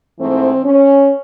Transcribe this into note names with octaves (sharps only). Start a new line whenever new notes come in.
G#2 E3 A3 C4
C#4